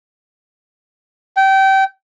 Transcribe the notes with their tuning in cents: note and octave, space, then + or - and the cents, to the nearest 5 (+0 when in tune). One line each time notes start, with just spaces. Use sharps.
G5 -25